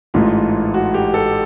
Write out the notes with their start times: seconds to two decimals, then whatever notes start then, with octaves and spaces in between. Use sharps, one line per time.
0.14 A1 G#2 E3 A3 F4
0.74 F#4
0.94 G4
1.14 A4